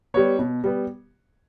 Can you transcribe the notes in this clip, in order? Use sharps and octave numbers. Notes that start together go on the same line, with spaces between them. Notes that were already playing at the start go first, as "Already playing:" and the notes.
G3 B3 C#5
B2
G3 B3